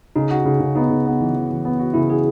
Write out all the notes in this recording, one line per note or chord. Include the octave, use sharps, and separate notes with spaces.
C#3 D#4
F#4
C#3
C#3
B3 D#4
C#3
B3
E3
E3
E3
B3
F#4
C#3 E4
F#4 G#4